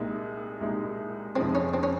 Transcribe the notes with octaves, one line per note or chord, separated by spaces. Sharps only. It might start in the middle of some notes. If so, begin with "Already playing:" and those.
Already playing: C2 A#2 G#3 D#4
C2 A#2 G#3 D#4
F2 C3 F3 G#3 C4 D#4
C#4
C4
C#4